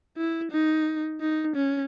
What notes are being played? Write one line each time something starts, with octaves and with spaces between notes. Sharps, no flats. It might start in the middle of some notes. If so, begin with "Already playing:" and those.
E4
D#4
D#4
C#4